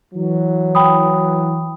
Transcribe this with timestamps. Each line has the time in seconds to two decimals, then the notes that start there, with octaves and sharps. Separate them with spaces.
0.14 E3 F#3
0.75 G5 B5 D#6